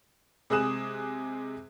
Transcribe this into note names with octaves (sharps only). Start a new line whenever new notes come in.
C3 G#3 G#4 D#6 F#6 E7